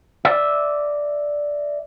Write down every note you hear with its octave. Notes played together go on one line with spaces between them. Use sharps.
D5 E5